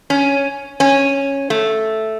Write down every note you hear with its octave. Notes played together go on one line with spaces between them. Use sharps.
C#4
C#4
A3